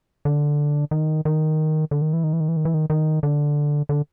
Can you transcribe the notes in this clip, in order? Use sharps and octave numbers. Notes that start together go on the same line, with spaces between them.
D3
D#3
D#3
D3
D#3
E3
D#3
E3
D#3
E3
D#3
E3
D#3
D#3
D3
D3